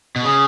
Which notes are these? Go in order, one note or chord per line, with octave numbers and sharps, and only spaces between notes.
B2
C#3 G#4